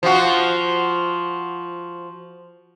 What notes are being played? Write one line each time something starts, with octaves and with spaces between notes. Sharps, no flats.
F3 F4 F#4